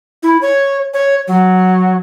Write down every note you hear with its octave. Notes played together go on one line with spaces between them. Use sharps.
E4
C#5
C#5
F#3